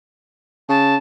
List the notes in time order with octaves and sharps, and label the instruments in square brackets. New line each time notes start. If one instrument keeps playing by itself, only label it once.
[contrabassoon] C#3 [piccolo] A5